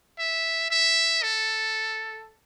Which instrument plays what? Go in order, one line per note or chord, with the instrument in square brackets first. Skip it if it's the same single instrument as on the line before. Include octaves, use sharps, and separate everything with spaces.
[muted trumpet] E5
E5
A4